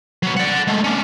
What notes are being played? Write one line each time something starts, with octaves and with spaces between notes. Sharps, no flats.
F#3 B3
D5 F#5
G#3 A3
C#4 D4